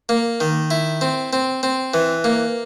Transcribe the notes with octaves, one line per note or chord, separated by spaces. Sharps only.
A#3
D#3
E4
C4
C4
C4
E3
A#3